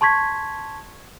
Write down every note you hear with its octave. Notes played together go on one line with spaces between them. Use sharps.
A5 C6 C#6 G#6 B6